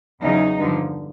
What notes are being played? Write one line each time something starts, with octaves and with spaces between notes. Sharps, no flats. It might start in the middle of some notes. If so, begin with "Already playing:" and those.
E2 C#3 F#3 D#4
G2 D3 F3